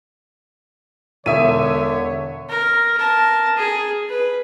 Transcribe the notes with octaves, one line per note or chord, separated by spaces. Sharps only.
E1 D3 C#5 E5 D#6 D#7
A#4
A#4 A5
G#4
B4